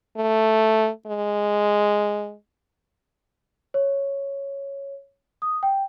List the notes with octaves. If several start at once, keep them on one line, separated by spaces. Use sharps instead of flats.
A3
G#3
C#5
D#6
G5